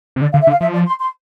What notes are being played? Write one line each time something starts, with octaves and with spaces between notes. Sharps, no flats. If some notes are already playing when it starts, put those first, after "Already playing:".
C3
D3 D5
D3 F5
E5
D3
F5
F3 E5
D5
C6
C6